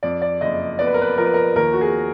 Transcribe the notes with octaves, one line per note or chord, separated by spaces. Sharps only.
F2 D5
D5
F#1 D#5
B3 D5
B4
A#4
B4
F3 A#4
B4
A#4
D#2 A#4
F#4
G#4